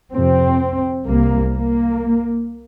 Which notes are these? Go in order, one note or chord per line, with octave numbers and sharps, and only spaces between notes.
F2 C3 C4
C2 C3 A#3
A#3